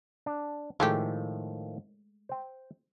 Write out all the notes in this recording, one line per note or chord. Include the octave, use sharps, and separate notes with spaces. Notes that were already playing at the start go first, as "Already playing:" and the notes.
D4
A2 D#3 F3 G#3 A3 G4
C5 G5